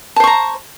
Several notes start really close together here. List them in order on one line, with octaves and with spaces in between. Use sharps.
A5 C5 C#6 A#5